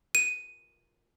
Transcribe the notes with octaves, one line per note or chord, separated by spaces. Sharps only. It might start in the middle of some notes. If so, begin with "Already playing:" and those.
D#7